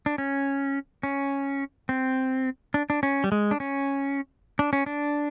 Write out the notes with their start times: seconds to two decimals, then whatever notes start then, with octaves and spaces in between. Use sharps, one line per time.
0.06 D4
0.18 C#4
1.03 C#4
1.89 C4
2.74 D4
2.90 D4
3.03 C#4
3.24 G3
3.32 G#3
3.51 D4
3.60 C#4
4.59 D4
4.73 C#4
4.86 D4